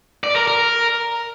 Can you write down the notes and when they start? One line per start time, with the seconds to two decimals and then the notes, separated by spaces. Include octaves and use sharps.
0.24 D5
0.36 A#4
0.48 A#4